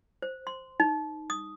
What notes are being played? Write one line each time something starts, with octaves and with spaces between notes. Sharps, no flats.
C5
C6
D#4
D#6